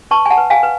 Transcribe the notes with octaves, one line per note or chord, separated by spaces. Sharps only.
B4 A5 C#6
G#5
F#5 A5
B4
F5 G#5
B4